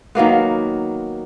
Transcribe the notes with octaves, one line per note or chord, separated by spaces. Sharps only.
D#3 F#3 A#3 B3